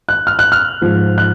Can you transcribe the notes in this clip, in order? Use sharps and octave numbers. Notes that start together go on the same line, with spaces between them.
F#6
F6
F#6
F6
G#2 F3
F#6